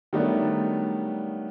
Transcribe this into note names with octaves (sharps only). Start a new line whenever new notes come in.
D#3 F#3 G3 A3 B3 D4